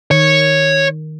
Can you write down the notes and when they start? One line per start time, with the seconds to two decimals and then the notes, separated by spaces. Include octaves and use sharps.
0.11 D#3 C#5